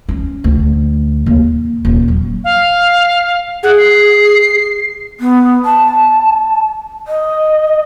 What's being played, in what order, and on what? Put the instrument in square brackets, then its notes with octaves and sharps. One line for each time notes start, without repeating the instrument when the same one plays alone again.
[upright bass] C#4
D2
D#2
D#1
F#3
[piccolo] F5
[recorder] G#4 [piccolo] F#5
[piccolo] C7
[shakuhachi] B3
A5
D#5